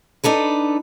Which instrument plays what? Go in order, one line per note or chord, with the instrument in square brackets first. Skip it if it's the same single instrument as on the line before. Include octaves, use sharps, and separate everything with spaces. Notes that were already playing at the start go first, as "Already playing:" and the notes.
[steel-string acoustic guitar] D4 D#4 A4 B4